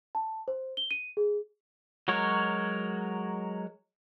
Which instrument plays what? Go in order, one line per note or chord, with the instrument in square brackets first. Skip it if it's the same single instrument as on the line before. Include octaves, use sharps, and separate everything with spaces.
[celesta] A5
C5
G7
D#7
G#4
[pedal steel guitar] F#3 G#3 F#4 A#4 C#5